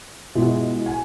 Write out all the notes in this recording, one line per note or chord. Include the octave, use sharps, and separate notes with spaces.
B2 G#3 E4
G#5